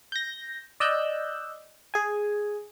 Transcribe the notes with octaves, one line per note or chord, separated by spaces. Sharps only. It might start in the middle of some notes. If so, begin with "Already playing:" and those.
G6 A#6
D5 D#5 E6 F#6 G6
G#4 G#5